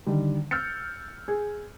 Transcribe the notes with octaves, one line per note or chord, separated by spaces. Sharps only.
D3 D#3 G3
E6 F6 G6 A6 C#7
G#4